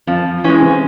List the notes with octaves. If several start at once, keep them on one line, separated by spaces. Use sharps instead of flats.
F2 F3
E3 G#3 C#4
C3